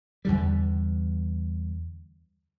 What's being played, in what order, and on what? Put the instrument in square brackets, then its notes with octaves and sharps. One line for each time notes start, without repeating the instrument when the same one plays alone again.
[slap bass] E2 D3 G3